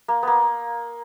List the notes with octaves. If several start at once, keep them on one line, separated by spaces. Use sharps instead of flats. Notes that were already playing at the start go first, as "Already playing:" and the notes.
A#3
A#3 B3